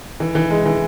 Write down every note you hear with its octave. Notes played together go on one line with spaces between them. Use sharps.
E3
E3
G#3
E3